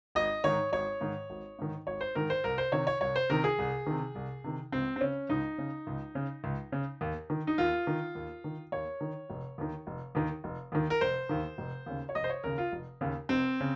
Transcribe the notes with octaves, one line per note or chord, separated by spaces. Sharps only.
G#1 D#5
G#2 D#3 C#5
G#1 C#5
G#2 D#3
G#1
G#2 D#3
G#1 C#5
C5
G#2 D#3 A#4
C5
C2 A#4
C5
C3 D#3 C#5
C#5
C2 C#5
C5
C3 D#3 A#4
G#4
C2
C3 D#3
C2
C3 D#3
C#2 C4
C4
C#3 C#4
C#2 D#4
C#3
C#2
C#3
C#2
C#3
D#2
D#3
D#4
D#2 F4
D#3
D#2
D#3
D#2 C#5
D#3
F1
D#2 D#3
F1
D#2 D#3
F1
D#2 D#3
A#4
F1 C5
D#2 D#3
F1
D#2 C#3
C#5
F1 D#5
C5
C#5
D#2 C#3 A#4
F4
F1
D#2 C#3
F1 C4
C#3